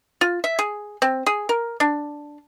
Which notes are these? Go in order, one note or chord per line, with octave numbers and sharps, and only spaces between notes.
F4
E5
G#4
C4
G#4
A#4
D4